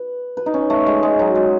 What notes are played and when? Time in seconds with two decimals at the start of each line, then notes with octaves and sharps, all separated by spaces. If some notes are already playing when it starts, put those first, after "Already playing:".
Already playing: B4
0.37 B4
0.46 D#4
0.54 C#4
0.70 A3
0.87 G#3
1.03 G#3
1.19 F#3
1.35 G#3